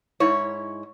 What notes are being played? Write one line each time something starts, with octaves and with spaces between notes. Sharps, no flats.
G#2 E4 C#5